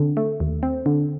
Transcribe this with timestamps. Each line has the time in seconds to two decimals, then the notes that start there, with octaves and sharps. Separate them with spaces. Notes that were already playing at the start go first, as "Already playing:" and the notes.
Already playing: D3 C4
0.17 A3
0.40 D#2
0.63 C4
0.86 D3